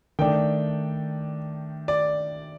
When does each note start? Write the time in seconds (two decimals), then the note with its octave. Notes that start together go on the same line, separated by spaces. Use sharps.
0.19 D#3 A3 D4 G5
1.88 D5